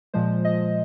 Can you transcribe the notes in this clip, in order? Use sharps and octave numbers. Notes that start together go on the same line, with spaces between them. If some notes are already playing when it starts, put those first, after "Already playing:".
A#2 F3 G#3 C5
D#5